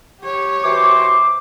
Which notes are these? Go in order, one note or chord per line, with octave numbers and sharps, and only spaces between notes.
G4 C#5
E3 F#4 C5 D6